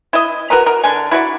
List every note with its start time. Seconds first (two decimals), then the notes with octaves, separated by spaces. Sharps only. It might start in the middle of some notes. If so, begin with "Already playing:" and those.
0.13 E4 D#5
0.50 F#4 A#4 B4 A#5
0.66 A#4
0.83 D3 G#5
1.11 E4 F#4 D5